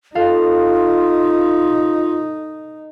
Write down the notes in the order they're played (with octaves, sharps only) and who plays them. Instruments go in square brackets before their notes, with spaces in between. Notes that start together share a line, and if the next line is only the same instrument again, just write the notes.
[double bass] D#4 [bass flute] F4 [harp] A4 F5